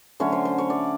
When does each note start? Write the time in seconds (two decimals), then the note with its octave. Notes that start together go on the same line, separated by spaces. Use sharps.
0.20 D3 F#3 A3 C#4 C#5
0.32 C5
0.45 C5
0.58 C#5
0.70 D5